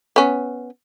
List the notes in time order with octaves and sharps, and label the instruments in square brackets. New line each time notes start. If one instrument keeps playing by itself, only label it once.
[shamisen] B3 C#4